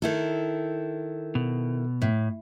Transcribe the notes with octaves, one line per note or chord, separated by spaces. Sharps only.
D#3 E4 A4
B2
A2